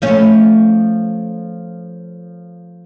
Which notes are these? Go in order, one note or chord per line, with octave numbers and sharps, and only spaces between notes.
F3 A3 C#4